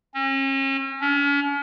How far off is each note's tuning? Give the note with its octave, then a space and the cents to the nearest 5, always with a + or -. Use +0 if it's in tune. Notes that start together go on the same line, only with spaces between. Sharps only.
C#4 -40
C#4 +40